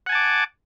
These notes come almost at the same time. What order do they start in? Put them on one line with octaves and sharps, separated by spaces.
F#5 G#5 A5 D6